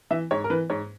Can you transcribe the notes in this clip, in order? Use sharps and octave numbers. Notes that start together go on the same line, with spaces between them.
E3 E5
G#2 C#5
A#4
E3 B4
G#2 C#5